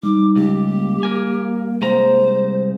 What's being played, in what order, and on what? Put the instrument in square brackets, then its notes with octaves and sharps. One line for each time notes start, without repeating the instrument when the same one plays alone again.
[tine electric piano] G3 [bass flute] D#4 [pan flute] D6
[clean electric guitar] C#2 [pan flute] G4
[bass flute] A#3
[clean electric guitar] A#4 G#5
[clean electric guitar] C2 G#3 A#5 [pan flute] C5